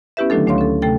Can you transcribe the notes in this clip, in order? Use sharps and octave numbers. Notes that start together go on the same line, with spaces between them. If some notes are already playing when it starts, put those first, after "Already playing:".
B3 C#4 E4 G4 B4 E5
D3 D#3 F#3 A3 D4 A4
D2 A3 D4 C#5 F5 C6
C#4 A4
C3 A3 A4 G5